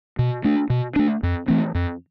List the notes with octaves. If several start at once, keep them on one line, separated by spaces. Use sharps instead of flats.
B2
A3 D4
B2
A3 D4
F2
E3 A3 C4
F2